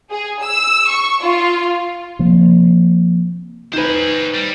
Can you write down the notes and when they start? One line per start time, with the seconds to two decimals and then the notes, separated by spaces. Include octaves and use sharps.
0.11 G#4
0.42 E6
0.88 C#6
1.22 F4
2.19 C3 F3 A#3
3.74 D#3 B4 C5 G#5
4.35 G3